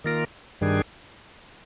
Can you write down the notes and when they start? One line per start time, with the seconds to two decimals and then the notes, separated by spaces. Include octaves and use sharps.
0.04 D#3 A#3 F4 A#4
0.61 G2 D#3 G3 D4 G#4